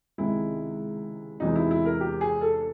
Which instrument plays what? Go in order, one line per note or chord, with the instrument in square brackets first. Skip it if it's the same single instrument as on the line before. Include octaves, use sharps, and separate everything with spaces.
[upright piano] C#2 C3 D#3 G#3 E4
E2 C3 E3 G#3 D#4
E4
E4
A#4
G4
G#4
A4